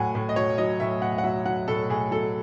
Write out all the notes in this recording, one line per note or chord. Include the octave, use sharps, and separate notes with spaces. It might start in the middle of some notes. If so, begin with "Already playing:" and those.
Already playing: A2 F#3 F#5 G#5
A2
D#5
F#3 C#5
F#3 D#5
A2 E5
A2 F#5
F#5
F#3 E5
F#3 F#5
A2 A4
A2 G#4
F#3 A4